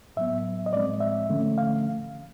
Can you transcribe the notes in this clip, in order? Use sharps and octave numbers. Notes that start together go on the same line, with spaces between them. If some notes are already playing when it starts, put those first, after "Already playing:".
A2 F#3 B3 E5
D#5
A2 F3 G#3 C4 D5
E5
D3 F3 A3 C#4
F5